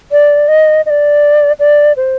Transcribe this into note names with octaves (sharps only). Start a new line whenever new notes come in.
D5
D#5
D#5
D5
D5
C5